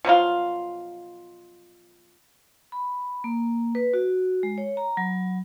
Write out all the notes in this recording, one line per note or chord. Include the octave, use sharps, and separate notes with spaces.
B2 F3 F#3 F4
B5
A#3
B4
F#4
G#3
C#5
A#5
F#3